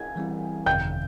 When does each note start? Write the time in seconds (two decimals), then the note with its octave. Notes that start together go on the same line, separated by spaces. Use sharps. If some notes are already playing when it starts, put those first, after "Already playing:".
Already playing: G#5 G#6
0.16 E3 G3 C4 E4
0.66 G1 F2 C3 D#3 G5 G6